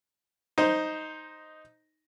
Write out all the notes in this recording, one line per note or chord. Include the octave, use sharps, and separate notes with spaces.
D#4 C5